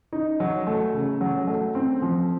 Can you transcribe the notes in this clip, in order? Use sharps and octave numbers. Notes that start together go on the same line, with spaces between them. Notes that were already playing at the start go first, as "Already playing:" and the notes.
D#4
F#3
A3
C#3
F#3
A3
C4
F3